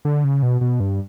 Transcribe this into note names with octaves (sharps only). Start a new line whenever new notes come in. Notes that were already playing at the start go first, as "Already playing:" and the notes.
D3
C#3
B2
B2
G2